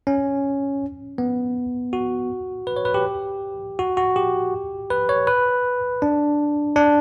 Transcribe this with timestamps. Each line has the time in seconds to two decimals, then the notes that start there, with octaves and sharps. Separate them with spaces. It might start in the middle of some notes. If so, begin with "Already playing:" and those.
0.07 C#4
1.18 B3
1.93 F#4
2.67 B4
2.76 C#5
2.85 B4
2.94 G4
3.79 F#4
3.97 F#4
4.16 G4
4.90 B4
5.09 C#5
5.27 B4
6.02 D4
6.76 D4